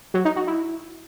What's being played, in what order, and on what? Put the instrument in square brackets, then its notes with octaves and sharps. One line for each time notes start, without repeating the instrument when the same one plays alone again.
[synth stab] F#3
D#4
F#4
E4